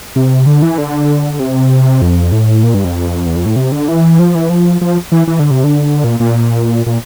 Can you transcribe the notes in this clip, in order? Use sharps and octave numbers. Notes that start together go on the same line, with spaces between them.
C3
D3
E3
D3
C3
F2
A2
A#2
G2
F2
E2
F2
A2
C3
D3
E3
F3
E3
F3
F3
E3
E3
D3
C3
D3
A#2
A#2
A#2